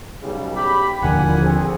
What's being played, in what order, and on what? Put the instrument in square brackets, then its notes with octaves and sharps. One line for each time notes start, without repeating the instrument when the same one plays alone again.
[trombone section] B1 C#3 G3
[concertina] G4 [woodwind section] B5
[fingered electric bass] D#1 D3 F3 [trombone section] A1 A#2 [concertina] A#3 [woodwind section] F#5 G#5
[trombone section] C4 G#4 A4